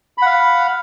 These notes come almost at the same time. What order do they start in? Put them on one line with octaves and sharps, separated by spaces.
B5 F#5 F5